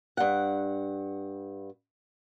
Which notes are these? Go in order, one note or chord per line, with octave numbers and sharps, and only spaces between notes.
G2 F#5